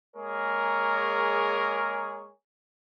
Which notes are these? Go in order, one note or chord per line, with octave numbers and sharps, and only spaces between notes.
G#3 A#3 G#4 A#4 C#5